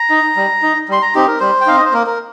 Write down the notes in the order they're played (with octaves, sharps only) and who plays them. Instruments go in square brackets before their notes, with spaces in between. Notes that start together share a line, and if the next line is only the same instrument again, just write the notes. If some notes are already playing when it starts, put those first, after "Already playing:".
Already playing: [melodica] A#5
D#4
G3
D#4
G3 C6
A#5
C4 D#4 G4
A#4
G3 C5
G5
C4 D#4 F5
D#5
C5
A#3 A#4
A#4